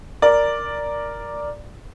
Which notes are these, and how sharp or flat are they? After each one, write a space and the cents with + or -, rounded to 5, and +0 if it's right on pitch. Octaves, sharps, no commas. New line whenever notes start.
A#4 +0 D5 +0